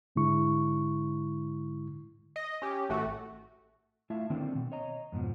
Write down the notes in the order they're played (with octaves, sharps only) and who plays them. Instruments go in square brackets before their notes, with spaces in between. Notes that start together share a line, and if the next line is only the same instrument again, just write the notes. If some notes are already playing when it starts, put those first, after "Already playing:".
[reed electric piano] G#2 D3 G#3 E4 C#6
[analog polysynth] D#5
C#4 G4
A1 A3 F#4
[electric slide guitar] A3 E4 F4 E5 A5
D3 D#3 A#3 C4 D4
B2
C#5 D#5 A#5
F2 G#2 B2 F3